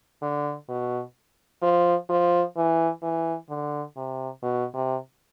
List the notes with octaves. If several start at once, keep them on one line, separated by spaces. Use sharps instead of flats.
D3
B2
F3
F3
E3
E3
D3
C3
B2
C3